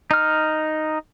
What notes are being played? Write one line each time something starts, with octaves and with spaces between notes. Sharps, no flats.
D#4 F6